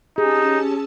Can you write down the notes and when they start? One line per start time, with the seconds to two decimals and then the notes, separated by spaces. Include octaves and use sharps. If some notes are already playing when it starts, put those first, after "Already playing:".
0.18 C#4 D#4 G4 G#4 A5 E6